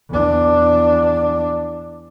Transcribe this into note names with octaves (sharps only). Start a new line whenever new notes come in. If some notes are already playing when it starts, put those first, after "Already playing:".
E2 D4